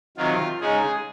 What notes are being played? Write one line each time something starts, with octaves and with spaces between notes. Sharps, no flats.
C3 D#3 F#3 F4
C#3 G#3 D#4 G#4